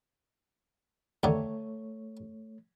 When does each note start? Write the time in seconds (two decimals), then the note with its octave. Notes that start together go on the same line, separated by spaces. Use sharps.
1.23 D#2 D3 A3 C#5